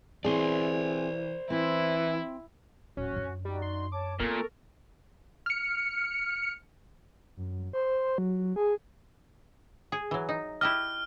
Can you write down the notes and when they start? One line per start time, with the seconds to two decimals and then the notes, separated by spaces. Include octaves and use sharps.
0.25 E3 C4 G#4 C5 D5
1.50 E3 C4 E4
2.97 D1 C#4 F#4
3.13 F#2 D4
3.45 G3 D#4 F#4 D5
3.62 C6
3.92 C#5 A5 D6
4.20 A#2 B3 C4 A4 A#4 C#6
5.46 F6 C#7
7.37 F#2
7.73 C5
8.18 F#3
8.56 G#4
9.92 G#4
10.11 E3 F#3
10.29 D#4
10.61 E4 G4 D#5 F6